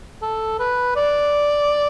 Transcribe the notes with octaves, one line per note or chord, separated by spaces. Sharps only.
A4
B4
D5